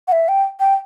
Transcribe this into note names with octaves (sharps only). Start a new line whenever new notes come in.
F#5
E5
G5
G5